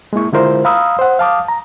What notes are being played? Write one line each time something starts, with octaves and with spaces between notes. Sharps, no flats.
G#3 A#3 E4 C#6
D3 G#3 E4 F4 A#4 C5
F5 A#5 B5 D#6 E6
C5 F#5
F5 A5 D6 D#6
A#5